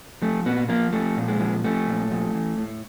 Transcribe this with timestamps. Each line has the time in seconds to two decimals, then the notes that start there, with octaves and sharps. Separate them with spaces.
0.22 F3 A3
0.46 A#2 B3
0.69 F3 A#3
0.93 F3 A3
1.17 A#2
1.28 G#3
1.40 F3
1.64 F3 A3
1.87 A#2
2.11 F3
2.34 E3
2.58 A2